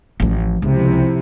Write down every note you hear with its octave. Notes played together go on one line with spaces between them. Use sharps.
A1 F3
C#2 C3 F3 E4